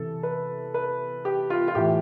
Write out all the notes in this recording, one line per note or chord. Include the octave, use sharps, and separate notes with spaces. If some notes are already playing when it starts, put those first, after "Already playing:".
Already playing: C3 E3 A4
B4
B4
G4
F4
F4
A2 E3 G4